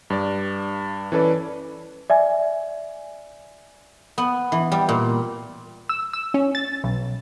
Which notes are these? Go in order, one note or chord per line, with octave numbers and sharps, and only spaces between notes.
G2 D5
E3 C#4 A4 B4 D5
D5 E5 G#5
B3
E3
G3
A#2
E6
E6
C#4
A6
B1